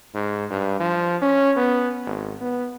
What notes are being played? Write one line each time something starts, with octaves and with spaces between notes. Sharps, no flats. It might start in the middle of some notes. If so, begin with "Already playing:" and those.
G#2
G2
F3
C#4
B3
G#1
B3